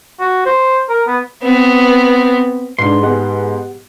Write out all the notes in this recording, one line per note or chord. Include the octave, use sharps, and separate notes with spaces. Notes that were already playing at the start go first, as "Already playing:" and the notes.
F#4
C5
A#4
B3
B3 C4
G#2 D4 B4 C6
G#3 B3 G4 F#5